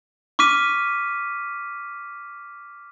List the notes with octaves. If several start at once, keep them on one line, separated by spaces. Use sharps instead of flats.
C#6 D6 F6 B6 D#7